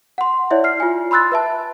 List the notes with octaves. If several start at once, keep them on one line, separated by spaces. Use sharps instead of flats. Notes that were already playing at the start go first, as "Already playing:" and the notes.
F#5 C6
E4 C#5 D5 E5
F6 C7
F4 G#5
B5 C6 E6 F#6 A6
B4 E5 A5